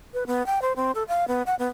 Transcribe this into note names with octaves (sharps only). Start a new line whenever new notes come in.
B4
B3
G5
C5
C4
A4
F5
B3
F#5
B3